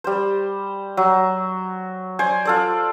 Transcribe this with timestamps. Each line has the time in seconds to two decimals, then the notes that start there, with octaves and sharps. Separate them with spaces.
0.04 G3 C5
0.97 F#3
2.19 C5 D5 G#5
2.45 F4 A4 D5